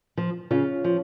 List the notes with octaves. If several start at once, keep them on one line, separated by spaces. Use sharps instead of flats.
F3
C#3 C#4 F4
F3